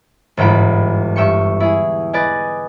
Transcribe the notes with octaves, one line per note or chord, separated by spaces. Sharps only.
G1 E2 G#2 G5 B5
G2 E5 G5 C#6 C#7
E4 G#4
B4 D5 D#5 G#5